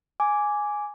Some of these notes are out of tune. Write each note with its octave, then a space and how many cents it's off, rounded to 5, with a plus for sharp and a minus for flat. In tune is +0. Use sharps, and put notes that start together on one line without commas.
G#5 +0 D6 -10